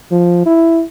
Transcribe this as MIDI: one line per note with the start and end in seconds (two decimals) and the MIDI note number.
0.12 0.45 53
0.46 0.82 64